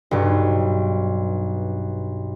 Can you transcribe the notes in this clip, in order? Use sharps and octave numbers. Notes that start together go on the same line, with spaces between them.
B1 G2